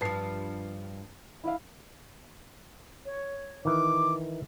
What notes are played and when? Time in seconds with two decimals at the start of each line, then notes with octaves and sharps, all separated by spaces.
0.01 G2 F3 B4 A5 C7
1.44 E4 E5 F5
3.06 C#5
3.65 D#3 E3 D6